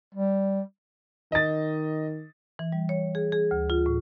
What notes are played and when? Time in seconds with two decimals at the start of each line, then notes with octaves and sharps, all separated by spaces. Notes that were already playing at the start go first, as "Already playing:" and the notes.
0.14 G3
1.32 D#3 D#5 A6
2.59 E3
2.72 G3
2.89 C#5
3.15 G#4
3.32 G#4
3.51 D2
3.70 F4
3.86 A2